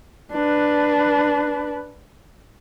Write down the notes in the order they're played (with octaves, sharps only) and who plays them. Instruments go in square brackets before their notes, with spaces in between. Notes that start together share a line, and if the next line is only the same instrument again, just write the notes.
[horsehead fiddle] D4 B4